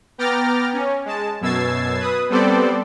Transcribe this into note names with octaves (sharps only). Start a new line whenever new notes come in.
B3 G5 A#5 D6 F6 A6
C#4
G#3 A5
F#2 B2 E6 G#6 A6 C7
B4 D#6
G3 B3 C4 A4 C5 D5